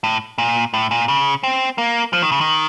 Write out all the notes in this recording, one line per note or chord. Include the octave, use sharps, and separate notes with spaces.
A2
A#2
A2
A#2
C#3
C4
A#3
F3
D#3
C#3
D#3